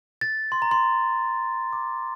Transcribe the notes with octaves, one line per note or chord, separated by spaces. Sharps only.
A6
C6
A#5
C6
D6